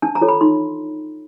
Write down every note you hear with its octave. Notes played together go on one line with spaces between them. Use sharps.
D4 A5
A#5
F4 A4 C#5
B5
D#4 C6